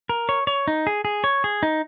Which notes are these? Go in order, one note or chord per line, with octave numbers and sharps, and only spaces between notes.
A#4
C#5
C#5
D#4
G#4
G#4
C#5
G#4
D#4